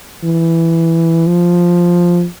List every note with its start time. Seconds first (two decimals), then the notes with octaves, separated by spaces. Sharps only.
0.23 E3
1.27 F3